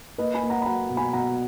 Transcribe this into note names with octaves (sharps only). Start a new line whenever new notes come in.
A#3 B4 D#5
G#5 B5
A#3
F#5 A#5
B5
F#3 F#5 A#5
B2
G#5 B5
B2 F#5 A#5